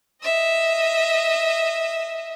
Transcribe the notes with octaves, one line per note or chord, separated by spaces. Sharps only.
D#5 E5